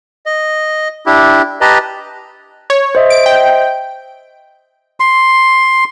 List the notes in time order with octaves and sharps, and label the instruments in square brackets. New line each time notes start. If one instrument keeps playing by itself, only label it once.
[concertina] D#5
D4 E4 G4
G4 B4 D#5 A5 A#5
[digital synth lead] C#5
[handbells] C5 D#5 E5
[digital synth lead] D7
G5
[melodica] C6